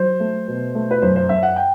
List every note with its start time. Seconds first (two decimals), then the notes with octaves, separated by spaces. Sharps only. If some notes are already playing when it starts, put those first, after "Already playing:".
Already playing: F#3 C5
0.20 A3
0.48 B2
0.75 A3
0.91 B4
1.02 F#2 C5
1.16 C5
1.29 F#2 E5
1.43 F#5
1.56 G5